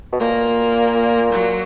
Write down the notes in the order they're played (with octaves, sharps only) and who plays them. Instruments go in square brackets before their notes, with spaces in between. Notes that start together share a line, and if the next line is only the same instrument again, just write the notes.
[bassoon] B2
[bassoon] A#2 [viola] A#3
[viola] F#3